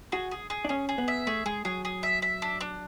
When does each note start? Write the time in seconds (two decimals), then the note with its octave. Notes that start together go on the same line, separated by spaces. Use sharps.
0.12 F#4 G#4
0.31 G#4
0.50 G#4
0.65 D4
0.69 C#4 G#4
0.89 G#4
0.98 B3
1.08 E5
1.27 A3 G#4
1.46 G#3 G#4
1.65 F#3 G#4
1.85 G#4
2.03 E5
2.22 E5
2.42 D4
2.61 D4